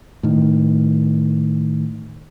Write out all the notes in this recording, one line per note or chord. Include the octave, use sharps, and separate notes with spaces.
A2 D#3